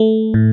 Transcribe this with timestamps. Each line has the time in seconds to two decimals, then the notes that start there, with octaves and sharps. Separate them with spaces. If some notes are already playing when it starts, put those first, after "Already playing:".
Already playing: A3
0.34 A2